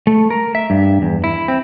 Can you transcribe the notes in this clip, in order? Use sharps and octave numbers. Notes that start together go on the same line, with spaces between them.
A3
A#4
E5
G2
E2
E4
C4